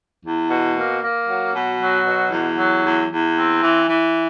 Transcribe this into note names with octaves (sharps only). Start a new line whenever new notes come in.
E2
B2
A#3
A#3
F#3
B2
F#3
B2
E2
F#3
E2
E2
C4
E3
E3